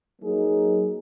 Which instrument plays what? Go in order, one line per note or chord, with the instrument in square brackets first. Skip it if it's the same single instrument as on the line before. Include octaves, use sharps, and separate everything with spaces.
[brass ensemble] F#3 A#3 D#4 G#4